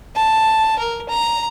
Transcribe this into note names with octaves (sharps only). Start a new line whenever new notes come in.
A5
A#4
A#5